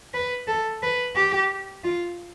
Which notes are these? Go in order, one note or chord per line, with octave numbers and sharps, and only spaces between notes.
B4
A4
B4
G4
F4